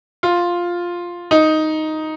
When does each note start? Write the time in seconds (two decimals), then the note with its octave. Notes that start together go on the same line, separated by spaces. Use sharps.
0.23 F4
1.31 D#4